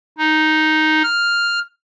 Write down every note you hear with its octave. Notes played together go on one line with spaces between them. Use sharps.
D#4
F6